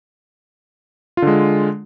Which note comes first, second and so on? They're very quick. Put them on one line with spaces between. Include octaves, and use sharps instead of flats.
F4 D3 G#3